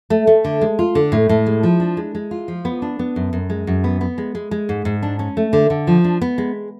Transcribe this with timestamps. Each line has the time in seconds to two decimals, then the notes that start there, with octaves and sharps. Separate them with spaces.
0.10 A3
0.27 A3
0.44 D3
0.61 G#3
0.79 F4
0.95 D3
1.12 A2
1.29 A2
1.46 G#3
1.63 F3
1.80 D4
1.97 G#3
2.15 G#3
2.31 F4
2.48 F3
2.65 B3
2.82 D4
2.99 B3
3.16 F#2
3.33 F#2
3.50 G#3
3.67 F#2
3.84 B3
4.01 B3
4.18 G#3
4.35 G#3
4.51 G#3
4.69 G#2
4.85 G#2
5.03 D4
5.19 C#4
5.37 A3
5.53 D3
5.70 D3
5.87 F3
6.04 D4
6.22 B3
6.38 G#3